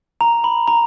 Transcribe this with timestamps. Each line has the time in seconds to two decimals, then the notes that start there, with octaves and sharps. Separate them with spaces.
0.21 A#5
0.44 B5
0.68 A#5